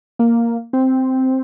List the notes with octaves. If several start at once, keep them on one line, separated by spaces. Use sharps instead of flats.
A#3
C4